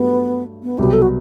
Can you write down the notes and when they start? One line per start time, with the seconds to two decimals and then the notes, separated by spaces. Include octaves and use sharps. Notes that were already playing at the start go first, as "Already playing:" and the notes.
Already playing: G2 F#3 A3 B3 G4
0.63 B3
0.78 C2 B2 F#3 B3 G4
0.93 A4
1.02 F#4